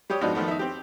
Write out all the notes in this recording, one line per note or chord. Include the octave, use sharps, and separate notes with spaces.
G3 G4 C#5 D#6
G#2 F3 B3 D4 D#4 F#4
D#3 F3 A3 B3
D#4 E5
C4 G4